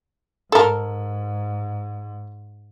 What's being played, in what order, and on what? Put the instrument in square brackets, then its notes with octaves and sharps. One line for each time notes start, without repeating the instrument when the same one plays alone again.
[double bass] G#2 [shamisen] A4 A#4